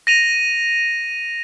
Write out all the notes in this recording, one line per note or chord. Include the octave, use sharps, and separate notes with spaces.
A#6 D#7 F7